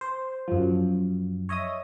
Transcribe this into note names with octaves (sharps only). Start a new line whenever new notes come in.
C5
F#2 F3
C#5 D#5 E5 D#6